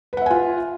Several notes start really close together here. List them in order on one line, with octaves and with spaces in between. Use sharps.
B4 F#5 E5 G#5 F4